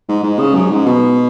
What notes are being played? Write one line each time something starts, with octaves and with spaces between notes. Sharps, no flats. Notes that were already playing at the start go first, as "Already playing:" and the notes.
G#2
G#2
C#3
F#2
G#2
B2